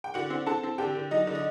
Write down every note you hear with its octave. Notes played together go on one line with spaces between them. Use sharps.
G5
D3 F#4 F#5
C4
C4 A4 A5
C4
D3 G4 G5
D3
F#3 D#4 D#5
D3
D#5